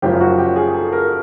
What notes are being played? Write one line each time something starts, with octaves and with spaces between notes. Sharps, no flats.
F#1 F#2 C#3 F3 G4
F#4
G4
G#4
A4
A#4